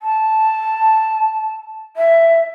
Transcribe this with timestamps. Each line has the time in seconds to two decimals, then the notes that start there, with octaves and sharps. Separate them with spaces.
0.01 A5
1.97 E5